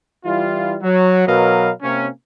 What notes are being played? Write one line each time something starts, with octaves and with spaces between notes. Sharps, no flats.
E3 G3 E4 F4
F#3
B2 F#3 A#4 B4 D#5 F5
C3 A#3 C4 C#4